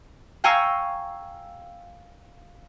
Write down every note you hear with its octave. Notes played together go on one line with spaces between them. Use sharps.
F5 G5 G#5 A#5 C#6 E6